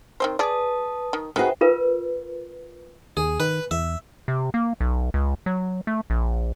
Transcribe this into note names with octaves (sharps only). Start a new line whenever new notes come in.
D#3 C4 C5
G#4 B4 D5 A5 D#6
D#3
D#3 F#4 G#4 B4 C5 E5 G5
F4 A#4 B4
D#2 G#4
D#3 B4
E2 E5
C3
A#3
B1
C#2
F#3
A3
A#1